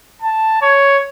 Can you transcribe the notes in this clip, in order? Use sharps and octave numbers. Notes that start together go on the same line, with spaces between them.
A5
C#5